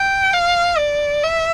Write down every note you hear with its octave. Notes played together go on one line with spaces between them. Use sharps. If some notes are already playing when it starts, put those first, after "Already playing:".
Already playing: G5
F5
D5
E5